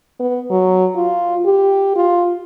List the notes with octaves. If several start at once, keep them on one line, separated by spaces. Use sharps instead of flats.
B3
F#3
F4
G4
F4